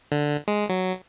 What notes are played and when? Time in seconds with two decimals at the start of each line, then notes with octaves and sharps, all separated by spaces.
0.12 D3
0.48 G#3
0.69 F#3